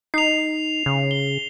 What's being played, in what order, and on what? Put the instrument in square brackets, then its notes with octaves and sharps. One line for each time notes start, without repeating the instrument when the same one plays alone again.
[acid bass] D#4 [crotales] C7 F7
[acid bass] C#3
[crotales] G7